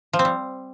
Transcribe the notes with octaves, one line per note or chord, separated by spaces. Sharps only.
F3
C4
G3